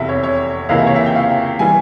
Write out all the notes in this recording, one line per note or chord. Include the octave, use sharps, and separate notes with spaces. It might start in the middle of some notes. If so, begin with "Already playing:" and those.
Already playing: F1 E2 C3 E5
C#5
C#5
C#2 C3 E3 A#3 F5
E5
C#5
E5
G5
F5
E3 G3 G#5